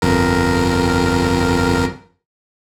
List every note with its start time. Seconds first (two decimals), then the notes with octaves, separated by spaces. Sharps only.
0.02 G1 F2 A#4